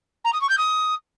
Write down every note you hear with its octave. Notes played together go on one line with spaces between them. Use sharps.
A#5
D#6
C#6
G6
D#6